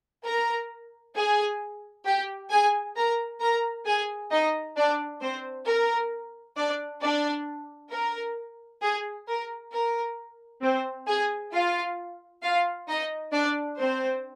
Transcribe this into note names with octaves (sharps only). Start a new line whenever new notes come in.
A#4 A#5
G#4 G#5
G4 G5
G#4 G#5
A#4 A#5
A#4 A#5
G#4 G#5
D#4 D#5
D4 D5
C4 C5
A#4
D4 D5
D4 D5
A#4
G#4
A#4
A#4
C4 C5
G#4 G#5
F4 F5
F4 F5
D#4 D#5
D4 D5
C4 C5